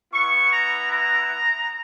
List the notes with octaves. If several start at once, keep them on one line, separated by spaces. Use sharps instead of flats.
B3 E4 C#6
A#5
A#5